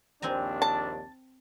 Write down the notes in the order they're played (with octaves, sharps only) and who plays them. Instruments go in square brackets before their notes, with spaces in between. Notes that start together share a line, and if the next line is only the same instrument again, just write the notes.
[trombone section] A#1 D#2 D4 [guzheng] C4 G#5 A#5
[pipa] A5